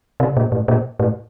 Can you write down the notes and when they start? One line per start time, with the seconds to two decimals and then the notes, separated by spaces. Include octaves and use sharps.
0.20 C3
0.37 A#2
0.52 A2
0.68 A#2
1.00 A2